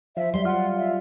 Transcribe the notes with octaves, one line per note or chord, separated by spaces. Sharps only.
F3 E5
F#3 G3 E5 C6
F4 F#5
E5